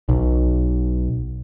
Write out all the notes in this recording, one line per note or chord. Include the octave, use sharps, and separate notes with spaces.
B1